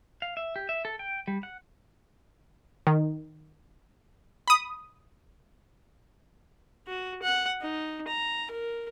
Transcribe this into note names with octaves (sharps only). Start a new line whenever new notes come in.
F5
E5
G4
E5
A4
G5
G3
F#5
D#3
B5 D#6
F#4
F#5
D#4
A#5
A#4